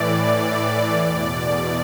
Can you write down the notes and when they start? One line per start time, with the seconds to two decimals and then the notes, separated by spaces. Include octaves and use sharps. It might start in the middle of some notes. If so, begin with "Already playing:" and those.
Already playing: A2 E3 D5
0.19 D5
0.96 E2 B2 D5